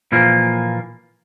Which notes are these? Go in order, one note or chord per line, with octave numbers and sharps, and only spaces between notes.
A#2 E3 F3 A#3